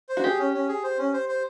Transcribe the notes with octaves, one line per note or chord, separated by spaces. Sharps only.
C5
F#4
G4 G#4
C#4
C#4
G#4
C5
C#4
C5
C5